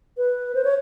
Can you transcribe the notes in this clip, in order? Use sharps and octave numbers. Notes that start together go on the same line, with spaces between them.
B4
C5
C#5